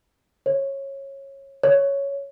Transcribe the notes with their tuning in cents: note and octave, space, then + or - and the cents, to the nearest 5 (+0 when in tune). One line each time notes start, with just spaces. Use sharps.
C#5 -20
C#5 +5